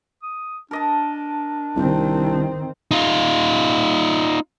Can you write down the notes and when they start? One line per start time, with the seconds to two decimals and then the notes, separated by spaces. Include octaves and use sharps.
0.23 D#6
0.71 D4 A#4 D#5 A5
1.76 C2 D#3 C4
2.91 D#4 F4